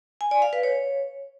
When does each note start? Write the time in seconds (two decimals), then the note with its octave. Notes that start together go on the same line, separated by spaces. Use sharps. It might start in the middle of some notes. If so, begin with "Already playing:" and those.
0.21 G#5
0.31 D5
0.42 F5
0.53 B4
0.63 C#5